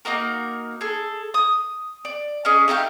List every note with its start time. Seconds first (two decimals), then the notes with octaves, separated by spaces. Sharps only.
0.05 A#3 D#4 F#4 A#4
0.81 G#4 A4
1.34 D#6
2.05 D5
2.45 C#4 G#4 D#5
2.68 A3 D#4 G4 F5